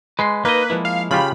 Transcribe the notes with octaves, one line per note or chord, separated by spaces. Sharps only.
G#3 B4 B5 C6
A#3 D#4 B4 D#5
F3 G#3 E4
F5
C#3 F4 G4 B5